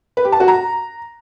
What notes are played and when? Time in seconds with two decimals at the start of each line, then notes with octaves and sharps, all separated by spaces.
0.17 B4
0.25 G4
0.32 A5
0.40 F#4
0.48 A#5